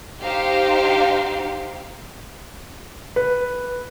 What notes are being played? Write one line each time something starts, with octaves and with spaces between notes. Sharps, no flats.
D#4 G4 C5 F5
B4